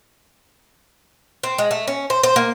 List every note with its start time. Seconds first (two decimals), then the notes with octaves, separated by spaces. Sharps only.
1.43 C4
1.58 G#3
1.71 A3
1.88 C#4
2.10 C5
2.23 C5
2.36 A#3